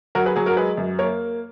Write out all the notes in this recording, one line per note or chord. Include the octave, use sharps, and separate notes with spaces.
F#3 F#4 A#4
G#4 B4
F#3 G#4
F#4 A#4
G#3 G#4 B4
F#2
A#3 A#4 C#5